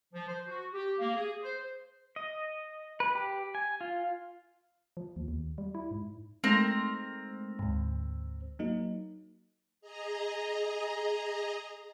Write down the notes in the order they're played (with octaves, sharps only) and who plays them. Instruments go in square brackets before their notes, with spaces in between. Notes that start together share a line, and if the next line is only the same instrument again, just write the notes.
[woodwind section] F3
C5
F#4
G4
A#3
G#4
C5
[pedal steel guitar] D#5
B4
G4
G#5
F4
[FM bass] F3
D#2
D#2
G3
E4
G#2
[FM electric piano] G#3 A3 D#4 [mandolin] C4 A#4
[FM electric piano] D2 G#2
F#3 A#3 D#4
[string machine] G#4 D#5 A#5